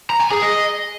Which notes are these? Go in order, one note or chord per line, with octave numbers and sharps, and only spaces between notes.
A#5
G#5
G#4
D#5